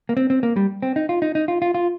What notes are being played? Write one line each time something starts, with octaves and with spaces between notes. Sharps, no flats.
A#3
C4
C4
A#3
G3
C4
D#4
F4
D#4
D#4
F4
F4
F4